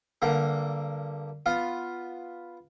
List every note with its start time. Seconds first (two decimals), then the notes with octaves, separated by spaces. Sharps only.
0.22 G2 D3 A#3
1.46 B3 F4